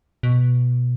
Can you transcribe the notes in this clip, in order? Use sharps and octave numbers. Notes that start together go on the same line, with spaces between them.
B2